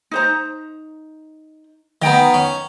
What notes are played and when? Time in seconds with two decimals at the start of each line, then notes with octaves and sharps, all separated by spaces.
0.11 D#4 C5 A#5
2.02 D#3 B3 D#5 G5 A#5
2.34 C#4